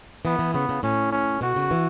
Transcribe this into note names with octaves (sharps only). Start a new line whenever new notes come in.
E3 B3
E3
C#3 B3
C#3
A2 C#4
C#4
B2 F#4
C#3
E3